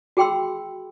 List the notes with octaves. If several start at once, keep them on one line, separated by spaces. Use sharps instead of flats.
F#4 G#4 G5 B5 C6 E6